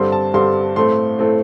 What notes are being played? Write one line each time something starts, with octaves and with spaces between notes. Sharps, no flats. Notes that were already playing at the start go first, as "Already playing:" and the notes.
Already playing: G2 D3 G3 C4 C6
A5
G2 D3 G3 C4 C6
A2 A3 C4 C6
A2 A3 C4